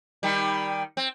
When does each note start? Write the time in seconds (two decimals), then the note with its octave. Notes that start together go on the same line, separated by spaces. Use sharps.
0.23 D#3 G3
0.97 C4